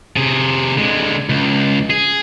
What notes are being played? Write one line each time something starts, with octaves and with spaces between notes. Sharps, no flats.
C3 G#4
D3 G#3
C#2
G#4